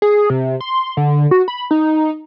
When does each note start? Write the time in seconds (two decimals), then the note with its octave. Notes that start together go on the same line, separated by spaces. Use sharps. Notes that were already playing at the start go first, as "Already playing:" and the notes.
0.02 G#4
0.30 C3
0.61 C6
0.97 D3
1.31 F#4
1.48 B5
1.71 D#4